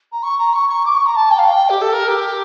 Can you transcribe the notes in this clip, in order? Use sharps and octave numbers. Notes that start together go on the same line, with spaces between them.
A#5
C#6
A#5
C#6
C#6
D6
C#6
A#5
A5
G5
F5
G5
G4
A4
A#4
G4